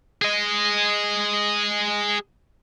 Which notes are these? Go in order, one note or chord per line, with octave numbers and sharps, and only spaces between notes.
G#4 D#5